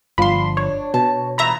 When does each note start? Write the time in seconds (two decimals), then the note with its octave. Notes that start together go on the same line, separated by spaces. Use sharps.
0.18 G1 F3 D4 F5 B5 C6
0.57 D4 C#5
0.94 B2 A5
1.38 E2 G2 A#2 E5 A#5 B5